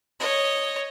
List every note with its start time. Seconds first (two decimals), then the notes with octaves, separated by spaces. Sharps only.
0.20 C#5 D#5